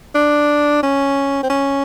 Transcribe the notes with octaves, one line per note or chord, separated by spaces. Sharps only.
D4
C#4
C4
C#4